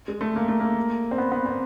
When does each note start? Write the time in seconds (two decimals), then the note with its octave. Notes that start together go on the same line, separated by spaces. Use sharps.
0.08 G#3
0.21 A3
0.36 A#3
0.48 A3
0.60 A#3
1.11 C4
1.18 B3
1.32 B3
1.46 C4